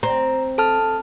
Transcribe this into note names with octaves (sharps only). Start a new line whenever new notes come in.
C4 A#5
A4 A5 F6